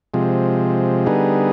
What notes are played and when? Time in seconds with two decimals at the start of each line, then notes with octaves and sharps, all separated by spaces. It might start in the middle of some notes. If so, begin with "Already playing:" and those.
0.14 C3 F3 G#3
1.06 D3 G3 B3 D#4 G#4